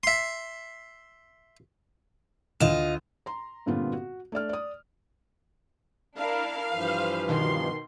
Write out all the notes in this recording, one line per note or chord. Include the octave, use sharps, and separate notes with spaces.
E5 C6
D2 F4 D#5 E7
A#5 C6
G2 A#2 D3 B3 C4 F4
F#4
A3 D4 D5 F6
D5 D#6
D4 E4 A#4 F5
G2 E3 F3 B4 C5
B2 D#3 C6